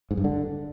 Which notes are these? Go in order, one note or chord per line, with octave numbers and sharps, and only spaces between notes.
G#2
G2
D3